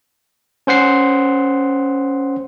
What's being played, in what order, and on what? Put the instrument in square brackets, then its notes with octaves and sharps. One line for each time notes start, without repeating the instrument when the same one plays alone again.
[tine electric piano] C#4 C5 F#5 C7